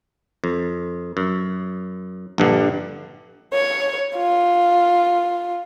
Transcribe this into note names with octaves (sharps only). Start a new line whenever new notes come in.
F2
F#2
A#1 G2 D3
C#5
F4